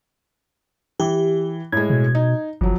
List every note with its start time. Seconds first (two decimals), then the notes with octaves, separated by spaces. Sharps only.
1.00 E3 G4
1.72 A2 G#3 G#6
1.90 B2
2.15 D#4
2.61 G1 F2 F#3